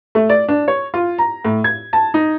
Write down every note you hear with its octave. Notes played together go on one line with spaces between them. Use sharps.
A3
D5
D4
C#5
F4
A#5
A2
G#6
A5
D#4